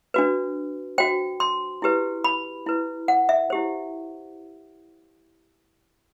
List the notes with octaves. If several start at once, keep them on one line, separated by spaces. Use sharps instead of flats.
D4 F#4 B4
F#4 C5 G5
C6
E4 G4 B4
B5
E4 B4
F#5
E5
E4 G4 C5